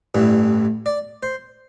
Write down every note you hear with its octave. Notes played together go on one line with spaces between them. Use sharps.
A1 G2 E3
D5
C5